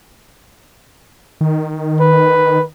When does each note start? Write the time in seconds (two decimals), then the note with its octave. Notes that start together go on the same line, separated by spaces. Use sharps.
1.41 D#3
2.00 B4